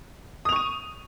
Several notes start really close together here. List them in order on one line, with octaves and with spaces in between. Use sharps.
D#6 F7 C#6 D#7